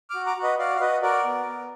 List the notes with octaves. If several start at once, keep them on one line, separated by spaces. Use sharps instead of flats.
D6 F6
F#4
A#5 D6
F#4
B4 D#5
F#4 D5 F5
F5
F#4 B4 D#5
F#4 A#4 D5
B3
B3